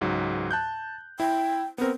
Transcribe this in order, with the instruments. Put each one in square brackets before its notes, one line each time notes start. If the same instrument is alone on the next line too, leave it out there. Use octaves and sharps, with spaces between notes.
[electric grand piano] C#2 G#2 F#3
A5 F#6 G6
[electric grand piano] E4 [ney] G5
[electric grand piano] B3 A#4 [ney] C4